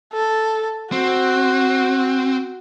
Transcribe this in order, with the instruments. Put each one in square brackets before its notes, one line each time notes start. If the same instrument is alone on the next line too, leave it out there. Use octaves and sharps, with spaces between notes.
[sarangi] A4
[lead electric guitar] C4 [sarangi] F#4